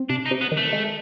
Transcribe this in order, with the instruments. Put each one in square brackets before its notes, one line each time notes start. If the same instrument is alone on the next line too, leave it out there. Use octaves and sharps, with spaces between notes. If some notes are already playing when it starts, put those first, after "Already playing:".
Already playing: [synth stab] C4
[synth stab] C3 [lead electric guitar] D4
[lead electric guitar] D#4
[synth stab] C3
[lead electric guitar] B3
[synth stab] D#3
[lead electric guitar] A3
[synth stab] G#3